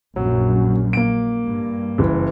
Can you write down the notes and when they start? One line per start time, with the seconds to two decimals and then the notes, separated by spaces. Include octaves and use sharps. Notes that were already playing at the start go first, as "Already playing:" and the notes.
0.16 A#1 F#2 F#3
0.93 A#3 D7
1.45 G2
1.98 F#1 E3